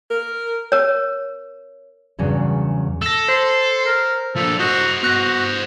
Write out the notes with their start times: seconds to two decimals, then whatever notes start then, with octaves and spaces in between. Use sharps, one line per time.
0.10 A#4
0.72 A#4 C#5
2.19 E2 G2 C#3 F#3
3.02 A4 E6 A#6
3.28 C5 C6
3.86 A#4
4.35 F3 D4 A4
4.59 F#4 C5 D#5
5.03 B3 F#4 F#6 A#6